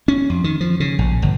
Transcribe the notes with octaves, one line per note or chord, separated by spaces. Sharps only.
C#4
F2
D#3
F3
C#3
A#1
G1